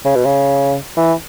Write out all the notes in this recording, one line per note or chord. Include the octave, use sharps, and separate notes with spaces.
C#3
B2
C#3
E3